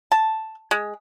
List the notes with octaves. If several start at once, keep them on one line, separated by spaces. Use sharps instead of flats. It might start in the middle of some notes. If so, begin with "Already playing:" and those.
A5
G#3